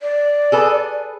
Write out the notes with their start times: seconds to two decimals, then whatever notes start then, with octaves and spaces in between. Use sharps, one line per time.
0.01 D5
0.52 G#4 A4 B4